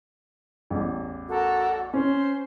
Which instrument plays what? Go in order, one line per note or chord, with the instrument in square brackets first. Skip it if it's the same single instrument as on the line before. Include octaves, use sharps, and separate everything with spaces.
[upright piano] A1 E2
[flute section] F#4 A4 A#4
[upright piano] C#4 [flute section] C5